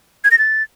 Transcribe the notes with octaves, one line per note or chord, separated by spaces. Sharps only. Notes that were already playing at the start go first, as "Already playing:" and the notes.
G#6
A#6
A6